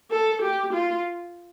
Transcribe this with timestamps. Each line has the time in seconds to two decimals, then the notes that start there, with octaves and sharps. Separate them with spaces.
0.11 A4
0.42 G4
0.73 F4